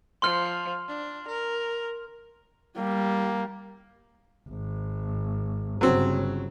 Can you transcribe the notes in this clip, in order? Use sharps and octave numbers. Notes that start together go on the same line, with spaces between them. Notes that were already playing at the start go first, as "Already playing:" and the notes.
F3 C6 F6
D4
A#4
G3 A#3
G#1
G1 C#3 F#3 C4